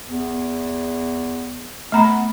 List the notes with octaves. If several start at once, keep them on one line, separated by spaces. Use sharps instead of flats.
E2
A3 B3 A#5 B5